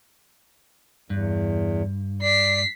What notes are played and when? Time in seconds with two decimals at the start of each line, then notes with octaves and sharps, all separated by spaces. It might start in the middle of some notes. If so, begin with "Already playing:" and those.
1.10 E2 G2
2.22 D5 B6 C7